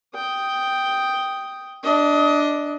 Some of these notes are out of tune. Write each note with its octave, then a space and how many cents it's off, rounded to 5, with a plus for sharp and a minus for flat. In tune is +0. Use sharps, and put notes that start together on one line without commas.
G5 +0 D#6 +0
D4 +0 D#5 +25